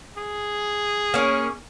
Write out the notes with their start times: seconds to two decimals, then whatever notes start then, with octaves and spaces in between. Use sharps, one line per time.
0.17 G#4
1.14 A#3 C#4